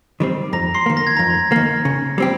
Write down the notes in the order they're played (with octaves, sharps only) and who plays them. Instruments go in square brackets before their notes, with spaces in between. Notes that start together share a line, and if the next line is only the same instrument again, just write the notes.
[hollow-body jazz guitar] D#3 G3 C4
[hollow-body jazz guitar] F2 [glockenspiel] A#5 A#6
[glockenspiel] C6 C7
[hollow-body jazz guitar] D#3 A#3
[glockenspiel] A#6
G#6
[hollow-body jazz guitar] F2 [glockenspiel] A#5 A#6
[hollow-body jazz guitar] D#3 A#3
C#3
G3 C4 G4